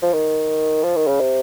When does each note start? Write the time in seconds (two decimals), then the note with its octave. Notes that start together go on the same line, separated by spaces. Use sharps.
0.02 F3
0.13 D#3
0.83 F3
0.96 D#3
1.08 C#3
1.20 C3